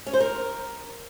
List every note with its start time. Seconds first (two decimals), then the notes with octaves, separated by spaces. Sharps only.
0.07 C#4
0.13 C5
0.20 A#4